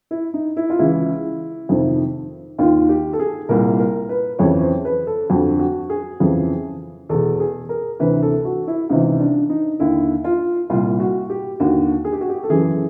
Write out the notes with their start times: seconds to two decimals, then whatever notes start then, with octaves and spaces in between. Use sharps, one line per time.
0.11 E4
0.34 D#4
0.57 E4
0.70 F4
0.79 C#2 C#3 E3 E4
1.69 F2 C3 D#3
2.58 D#2 D#3 F4
2.89 G4
3.13 A4
3.19 G#4
3.49 C2 A#2 A#4
3.79 A#4
4.09 B4
4.39 F2 C#3 E3 C#5
4.61 C5
4.85 B4
5.07 A4
5.30 F2 D3 F#4
5.59 F#4
5.90 G#4
6.20 F2 C#3 E3
7.09 E2 B2 A4
7.40 G#4
7.69 A#4
8.00 D2 C3 E3 B4
8.22 A4
8.45 F#4
8.67 E4
8.90 C#2 C3 E3 D#4
9.20 D4
9.50 D#4
9.80 D#2 D3 E4
10.24 F4
10.70 C2 A#2 F4
11.00 F#4
11.30 G4
11.60 D#2 D3 F#4
12.05 G#4
12.13 G4
12.21 F#4
12.29 G4
12.43 A4
12.50 F#2 C#3 E3 G#4